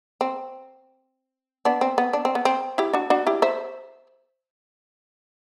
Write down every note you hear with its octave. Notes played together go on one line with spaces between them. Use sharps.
C4
B3 D4
C4
B3
D4
C4
B3
C4
E4 G4
D4 F#4
D4 F#4
E4 G4
C5 E5